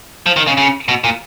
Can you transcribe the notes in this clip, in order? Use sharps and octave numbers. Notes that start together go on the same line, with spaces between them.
F3
D#3
C#3
C#3
B2
A#2